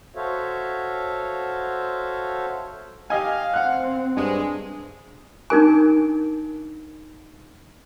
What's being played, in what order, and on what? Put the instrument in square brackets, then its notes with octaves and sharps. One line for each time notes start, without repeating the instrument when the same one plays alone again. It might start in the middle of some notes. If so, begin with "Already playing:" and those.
[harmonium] F#4 A4 C5 C#5 E5 F5
[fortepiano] G4 D#5 G#5 [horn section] F5
[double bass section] C4 [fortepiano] F#5 F#6
[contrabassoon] G2 [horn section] G#3
[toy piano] D4 D#4 A#4 G#5